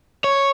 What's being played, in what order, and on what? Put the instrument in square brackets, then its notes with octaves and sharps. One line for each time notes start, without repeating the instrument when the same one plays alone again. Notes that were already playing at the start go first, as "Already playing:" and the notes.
[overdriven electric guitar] C#5